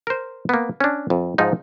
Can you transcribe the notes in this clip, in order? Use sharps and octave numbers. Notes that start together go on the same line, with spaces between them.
A#4 C5
A#3 B3
C#4 D4
F2
G#2 F3 D#4